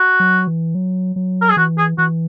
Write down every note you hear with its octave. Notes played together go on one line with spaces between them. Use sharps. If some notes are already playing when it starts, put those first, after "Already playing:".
Already playing: F#4
F#3
E3
F#3
F#3
A#4
G#4
E3 F#4
G#4
E3 F#4